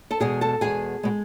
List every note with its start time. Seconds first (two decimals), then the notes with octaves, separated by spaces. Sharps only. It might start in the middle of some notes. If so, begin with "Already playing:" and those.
0.11 A4 A5
0.20 E2 B2 G#3 G#4 G#5
0.41 A4 A5
0.61 E2 B2 G#3 G#4 G#5
1.03 B2 G#3